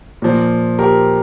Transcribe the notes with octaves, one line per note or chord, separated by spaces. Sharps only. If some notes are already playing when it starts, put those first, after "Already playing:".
A#2 F3
G4 A#4